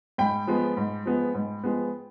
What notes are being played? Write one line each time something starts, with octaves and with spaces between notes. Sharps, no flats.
G#2 G5 B5
F3 G#3 B3
G#2
F3 G#3 B3
G#2
F3 G#3 B3